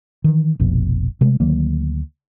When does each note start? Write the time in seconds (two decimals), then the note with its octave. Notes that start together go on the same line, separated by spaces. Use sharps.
0.24 D#3 E3
0.60 F1 A#1 F2 B2
1.21 C3 G#3 A3
1.40 D2 D#3 F#3 A#3